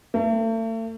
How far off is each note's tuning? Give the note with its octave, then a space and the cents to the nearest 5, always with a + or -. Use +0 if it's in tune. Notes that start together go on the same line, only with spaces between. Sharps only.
A3 +40